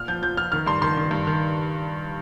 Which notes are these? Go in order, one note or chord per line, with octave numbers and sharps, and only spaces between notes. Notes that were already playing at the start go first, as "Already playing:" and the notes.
Already playing: A#2 F6
F3 G6
F3 G6
F3 F6
D#3 F6
G2 C6
D#3 C6
D#3
G2
D#3